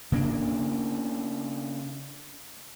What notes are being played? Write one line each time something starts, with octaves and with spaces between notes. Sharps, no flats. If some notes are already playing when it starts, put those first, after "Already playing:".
C#3 A#3 C4 D4